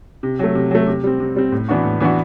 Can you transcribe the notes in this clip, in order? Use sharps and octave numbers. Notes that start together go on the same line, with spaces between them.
C3
F#3 A3
C3
F#3 A3
C3
G3 C4
C3
G3 C4
A2
E3 B3 D4 F#4
A2
E3 B3 D4 F#4